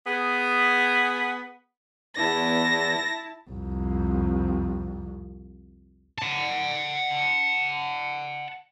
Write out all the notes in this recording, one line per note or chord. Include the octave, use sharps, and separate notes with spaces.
B3 G#4
E2 E4 A5 A#6
C2 F2
F#5 A5